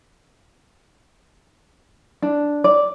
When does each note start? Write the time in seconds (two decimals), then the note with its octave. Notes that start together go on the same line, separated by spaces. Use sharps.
2.22 D4
2.64 D5